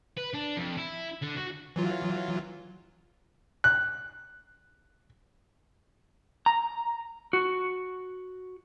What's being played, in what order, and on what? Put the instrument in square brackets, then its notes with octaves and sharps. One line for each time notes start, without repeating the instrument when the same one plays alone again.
[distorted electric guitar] B4
D4
F2
E4
D3
F#4
[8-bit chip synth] E3 F#3 F4
[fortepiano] F#6
[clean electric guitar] A#5
F#4